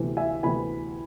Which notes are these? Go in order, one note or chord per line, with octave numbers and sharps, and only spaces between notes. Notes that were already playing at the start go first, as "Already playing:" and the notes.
Already playing: D2 C3 E3 B3
E5 G#5
D2 C3 E3 B3 G#5 B5